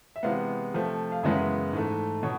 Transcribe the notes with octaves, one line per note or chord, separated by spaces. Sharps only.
E5
C3 E3 G#3 B3 F5
C3 F3 A3
F5
F#2 C#3 E3 G#3 B3 E5
G#2 E3 A3
B2 C#5